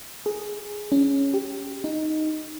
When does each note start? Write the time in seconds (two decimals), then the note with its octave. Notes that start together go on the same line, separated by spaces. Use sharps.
0.26 G#4
0.92 C#4
1.34 G4
1.84 D#4